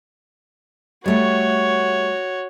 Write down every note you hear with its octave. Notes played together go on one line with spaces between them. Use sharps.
G3 A3 F#4 C#5